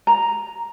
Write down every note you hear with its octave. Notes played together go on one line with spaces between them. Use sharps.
A#5